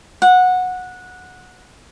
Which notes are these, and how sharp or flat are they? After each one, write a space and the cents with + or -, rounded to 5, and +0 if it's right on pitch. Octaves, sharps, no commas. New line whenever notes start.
F#5 -15